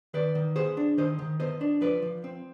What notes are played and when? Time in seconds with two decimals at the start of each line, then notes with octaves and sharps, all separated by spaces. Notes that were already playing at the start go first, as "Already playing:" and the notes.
0.14 D#3 B4 D5
0.35 D#3
0.56 B3 G#4 C5
0.77 D4
0.98 D#3 C5 D#5
1.19 D#3
1.40 B3 C5 D#5
1.61 D4
1.81 F3 B4 D5
2.02 F3
2.24 C4